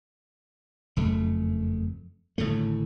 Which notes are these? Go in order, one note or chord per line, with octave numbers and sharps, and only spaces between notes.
F#1 F2 A3
G#1 A2 D3 A3